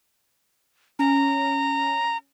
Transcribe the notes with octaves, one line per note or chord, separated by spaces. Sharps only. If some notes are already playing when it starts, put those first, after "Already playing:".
C#4 A#5